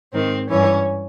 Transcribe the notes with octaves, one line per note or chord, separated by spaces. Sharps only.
G#2 D#3 C4
G2 E3 C#4